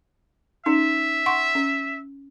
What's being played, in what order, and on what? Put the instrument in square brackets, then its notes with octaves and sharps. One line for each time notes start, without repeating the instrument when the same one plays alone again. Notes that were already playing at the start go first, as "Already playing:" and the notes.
[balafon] C#4 D#4 [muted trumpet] E5
[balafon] F#5 C6 C#6
C#4